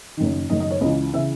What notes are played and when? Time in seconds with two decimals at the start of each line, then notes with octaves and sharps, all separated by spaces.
0.17 F#1 F#2 D#3
0.50 F#1 F#2 D#3 D#5
0.60 D#5
0.71 C#5
0.81 C#2 C#3 E3 D#5
1.13 C#3 E3 E5